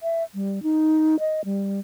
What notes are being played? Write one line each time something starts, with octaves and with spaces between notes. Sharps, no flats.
E5
G3
D#4
D#5
G3